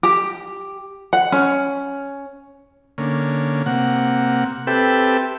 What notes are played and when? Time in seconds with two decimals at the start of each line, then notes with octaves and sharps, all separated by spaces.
0.03 G4
1.13 F#5
1.32 C#4
2.98 D3 A#3 C#4
3.66 C3 A#3 F#5
4.67 C4 G4 A4 B4 E5 G5